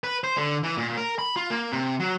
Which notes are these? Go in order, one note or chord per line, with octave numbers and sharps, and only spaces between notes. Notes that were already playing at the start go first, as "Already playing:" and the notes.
B4
C5
D3
E3
A#2
A#4
B5
F4
A#3
C3
F#3